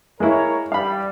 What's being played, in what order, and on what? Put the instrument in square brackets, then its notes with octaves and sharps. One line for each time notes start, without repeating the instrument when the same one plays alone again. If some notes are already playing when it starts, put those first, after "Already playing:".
[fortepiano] G#3 A#3 E4 [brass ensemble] A#4 C#5
[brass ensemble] G3 [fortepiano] F5 B5